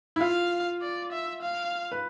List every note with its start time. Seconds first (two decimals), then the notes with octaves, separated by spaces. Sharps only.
0.16 E4
0.21 F4 F5
0.81 D5
1.12 E5
1.42 F5
1.92 B4